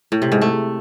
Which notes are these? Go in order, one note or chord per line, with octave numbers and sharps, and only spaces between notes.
A2
C3
G#2
A3